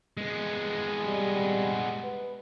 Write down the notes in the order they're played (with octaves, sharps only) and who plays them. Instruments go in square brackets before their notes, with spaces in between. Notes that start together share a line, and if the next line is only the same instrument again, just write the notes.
[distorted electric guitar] G#3 B3
[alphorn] G3
B4